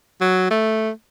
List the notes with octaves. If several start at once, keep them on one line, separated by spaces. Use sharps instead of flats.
F#3
A3